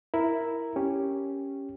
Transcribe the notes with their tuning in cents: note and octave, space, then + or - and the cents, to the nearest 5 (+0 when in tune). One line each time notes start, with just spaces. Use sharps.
E4 +0 A#4 +0
C#4 +0 G4 +0